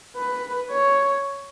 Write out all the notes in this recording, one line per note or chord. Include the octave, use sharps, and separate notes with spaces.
B4
C#5